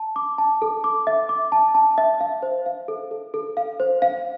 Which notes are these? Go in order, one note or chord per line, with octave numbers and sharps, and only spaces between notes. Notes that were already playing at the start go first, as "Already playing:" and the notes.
Already playing: A5
D6
A5
A4
D6
E5
D6
A5
A5
E5
F5
C5
F5
A4
A4
A4
F5
C5
F5